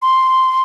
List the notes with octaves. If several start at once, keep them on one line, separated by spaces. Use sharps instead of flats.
C6